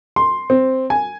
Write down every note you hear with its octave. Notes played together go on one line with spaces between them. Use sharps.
C6
C4
G#5